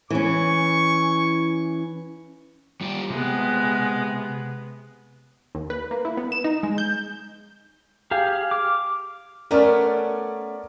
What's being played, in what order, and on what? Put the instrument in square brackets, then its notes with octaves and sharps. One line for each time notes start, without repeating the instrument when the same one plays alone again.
[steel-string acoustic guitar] E3 C#4 [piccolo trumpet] C#6
[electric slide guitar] G3 F4 G4
[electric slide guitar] C3 [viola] G#3 B3
[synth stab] D#2
B4
A#3
E4
B3
E7
D#4
G#3
G6
[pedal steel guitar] G4 G#4 F5
D6 F6
[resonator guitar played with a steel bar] A3 B3 C#4 [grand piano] A#4 D5